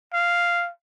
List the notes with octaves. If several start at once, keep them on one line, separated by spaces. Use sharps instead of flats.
F5